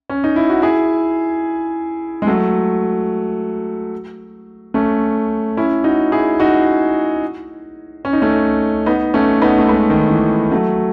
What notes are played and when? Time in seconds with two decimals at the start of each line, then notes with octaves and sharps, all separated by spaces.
0.10 C#4
0.24 D#4
0.36 E4
0.50 F#4
0.62 E4 G#4
2.22 G#3
2.27 F#3 A3
4.74 A3 C#4
5.57 C#4 E4
5.84 D#4 F#4
6.12 E4 G#4
6.40 D#4 F#4
8.05 C#4
8.13 D#4
8.22 A3 C#4
8.86 B3 D#4
9.14 A3 C#4
9.41 B3 D#4
9.59 A3
9.69 G#3 B3
9.90 D#3
10.10 E3
10.52 F#3 A3